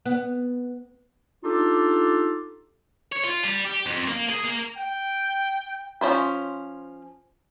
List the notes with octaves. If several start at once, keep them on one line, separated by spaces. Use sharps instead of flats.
B3
D4 D#4 F4 G4 A4
C#5
F4
G3
G4
F2
A#3
G#4
A#3
G5
F3 C#4 D4 C5 B5